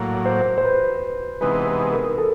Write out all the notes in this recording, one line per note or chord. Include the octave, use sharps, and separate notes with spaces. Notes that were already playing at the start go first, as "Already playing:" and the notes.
Already playing: A2 F#3 A#3
C5
C5
B4
C3 E3 G#3 B3 D#4 B4
B4
A#4
A4